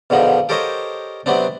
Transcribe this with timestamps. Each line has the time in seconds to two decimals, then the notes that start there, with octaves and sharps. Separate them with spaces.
0.10 E2 B2 D3 F3 D#4
0.49 G4 A4 A#4 C5 C#5 D#5
1.26 C3 F#3 B3 C4 D4